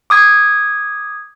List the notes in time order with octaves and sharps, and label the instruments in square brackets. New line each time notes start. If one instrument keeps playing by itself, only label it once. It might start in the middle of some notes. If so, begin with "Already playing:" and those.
[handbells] D6 D#6 G#6